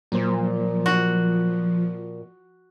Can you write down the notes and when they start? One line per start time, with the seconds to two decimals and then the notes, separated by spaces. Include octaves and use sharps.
0.12 A#2 F3 F#3 A#3 C5
0.86 F#4